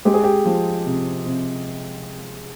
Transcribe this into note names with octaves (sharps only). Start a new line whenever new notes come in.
G#3 G4
G#4
G4
F3
C3
C3